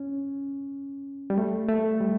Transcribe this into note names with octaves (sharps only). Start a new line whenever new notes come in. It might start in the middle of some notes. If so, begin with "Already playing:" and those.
Already playing: C#4
G3
A3
A3
G3